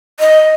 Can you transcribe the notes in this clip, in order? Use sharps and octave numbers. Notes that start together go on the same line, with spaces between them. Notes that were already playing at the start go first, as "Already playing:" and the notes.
D#5